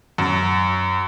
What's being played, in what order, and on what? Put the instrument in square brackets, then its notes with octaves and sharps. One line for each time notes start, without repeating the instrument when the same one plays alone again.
[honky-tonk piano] F#2